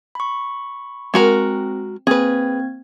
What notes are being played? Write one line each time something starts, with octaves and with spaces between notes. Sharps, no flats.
B5 C#6
G#3 C4 F#4 A#4
A#3 C4 G#4 B4 G#6